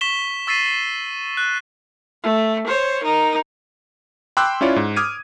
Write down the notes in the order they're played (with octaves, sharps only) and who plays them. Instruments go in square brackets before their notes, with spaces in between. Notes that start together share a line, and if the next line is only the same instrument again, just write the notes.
[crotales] C#6 B6 E7 G7
C#6 E6 A6 B6 C7 D#7
F#6
[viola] A3
C5 C#5
D#4 A#4
[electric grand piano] G5 B5 C6 D6 E6 F#6
C#4 E4 F4 C#5 D5
G#2
D6 D#6 F6 G#6 D#7